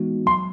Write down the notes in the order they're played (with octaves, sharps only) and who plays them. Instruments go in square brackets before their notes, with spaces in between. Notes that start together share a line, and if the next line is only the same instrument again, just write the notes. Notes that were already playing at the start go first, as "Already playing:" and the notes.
Already playing: [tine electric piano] E3 G#3 B3 D#4 F#4
[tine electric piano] F#3 [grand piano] C6